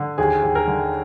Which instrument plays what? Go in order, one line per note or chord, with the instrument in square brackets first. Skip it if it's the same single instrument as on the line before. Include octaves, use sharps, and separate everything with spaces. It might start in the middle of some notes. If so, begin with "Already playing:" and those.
Already playing: [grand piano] D3
D#2 G#4
D#2
A#4
D3